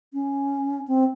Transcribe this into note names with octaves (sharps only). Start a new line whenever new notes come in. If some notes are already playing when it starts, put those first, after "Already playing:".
C#4
C4